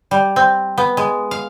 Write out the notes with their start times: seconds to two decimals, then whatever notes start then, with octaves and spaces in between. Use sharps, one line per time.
0.11 G3
0.36 C4
0.78 B3
0.97 G#3
1.31 F5